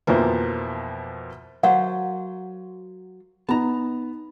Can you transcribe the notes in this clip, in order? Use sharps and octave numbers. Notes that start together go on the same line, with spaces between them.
F2 B2 E3 F3 A#3
F#3 A#4 C5 F5 F#5
B3 D#4 A5 A#5